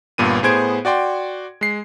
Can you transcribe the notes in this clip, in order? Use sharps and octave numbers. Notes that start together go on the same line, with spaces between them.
G1 G2 A#2 B3 D#7
A2 B3 G#4 C5 G#6 D7
F#4 D5 G5 C6
G#3 C7